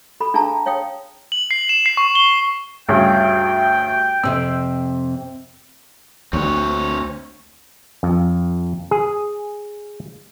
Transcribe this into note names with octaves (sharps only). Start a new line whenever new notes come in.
A4 B5
D4 G#4 F5 A5 A#5
C#5 F5 G5 D#6
F#7
C7
E7
C7
C#6
G7
D2 G2 C#3 G5
F2 C3 C4 E6
D2 C4 C#5
F2
G#4